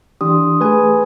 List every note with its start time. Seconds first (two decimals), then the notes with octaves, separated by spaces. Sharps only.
0.21 E3 D4 G4 C6 D#6
0.61 A3 G#4 B4 G#5